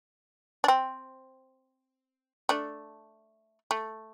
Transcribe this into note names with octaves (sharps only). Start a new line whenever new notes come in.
D4
C4
A3 D4
A3